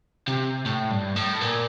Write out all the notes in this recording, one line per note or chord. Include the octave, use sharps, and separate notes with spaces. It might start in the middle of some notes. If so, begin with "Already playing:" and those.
C3
A2
G2
A2
A#2